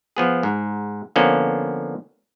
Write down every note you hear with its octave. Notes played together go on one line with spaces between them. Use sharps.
F3 B3 G#4
G#2
D3 F3 A#3 B3 C#4